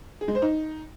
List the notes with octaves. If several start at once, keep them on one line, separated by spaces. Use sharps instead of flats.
G#4
G#3
C5
D#4